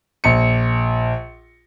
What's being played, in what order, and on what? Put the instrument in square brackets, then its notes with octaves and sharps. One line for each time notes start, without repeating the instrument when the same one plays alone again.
[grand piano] A#1 C#7